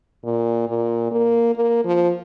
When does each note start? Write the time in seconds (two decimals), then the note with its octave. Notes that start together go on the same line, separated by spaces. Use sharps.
0.24 A#2
0.68 A#2
1.11 A#3
1.55 A#3
1.85 F3